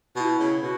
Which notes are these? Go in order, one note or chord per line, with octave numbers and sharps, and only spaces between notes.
B2 E4 F#4
C#3
B2 F#4